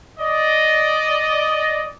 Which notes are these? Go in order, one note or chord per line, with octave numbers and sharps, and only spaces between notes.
D5 D#5